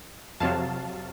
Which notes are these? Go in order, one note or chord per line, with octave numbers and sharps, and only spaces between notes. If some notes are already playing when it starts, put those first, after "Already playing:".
F2 C3 F#3 F5 A5